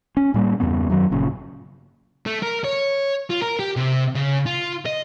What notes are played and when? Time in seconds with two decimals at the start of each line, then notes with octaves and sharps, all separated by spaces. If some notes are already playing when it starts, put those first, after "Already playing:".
0.17 C#4
0.34 A2 G3 A#3
0.60 E2 G2 C#3 B3
0.90 F#2 D#3 F#3
1.11 G1 A#2 C#3
2.26 A3
2.43 A#4
2.65 C#5
3.30 F4
3.42 A#4
3.60 G4
3.76 C3
4.15 C#3
4.46 F4
4.86 D#5